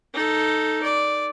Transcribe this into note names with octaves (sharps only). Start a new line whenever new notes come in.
D#4 A4
D5